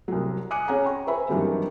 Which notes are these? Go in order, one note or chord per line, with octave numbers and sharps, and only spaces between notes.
C2 F#3
G#5 D6 D#6 F#6 C#7 D#7
C#4 G#4 F#5 G#5 A#5
G5 A#5 C#6
B4 C5 E5 G#5 B5
G2 D#3 E3 F#3 G3 C4